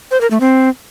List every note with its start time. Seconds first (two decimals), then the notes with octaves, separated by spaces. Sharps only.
0.11 C5
0.21 A#4
0.31 A3
0.40 C4